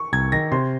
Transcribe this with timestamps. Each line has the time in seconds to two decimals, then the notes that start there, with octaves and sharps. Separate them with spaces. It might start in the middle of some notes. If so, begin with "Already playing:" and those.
Already playing: C#6
0.13 C2 G#6
0.32 D#3 A#6
0.52 C3 C6